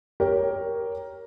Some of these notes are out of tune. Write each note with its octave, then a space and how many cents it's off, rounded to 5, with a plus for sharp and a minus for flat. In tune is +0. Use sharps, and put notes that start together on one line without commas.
G4 +0 A#4 +5 C#5 +10